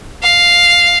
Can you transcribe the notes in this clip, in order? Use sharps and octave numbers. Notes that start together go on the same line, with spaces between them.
F5